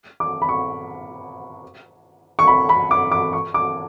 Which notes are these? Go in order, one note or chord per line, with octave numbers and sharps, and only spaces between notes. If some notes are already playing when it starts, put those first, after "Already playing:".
D6
B5
C#6
C#6
B5
B5
D6
D6
C#6
D6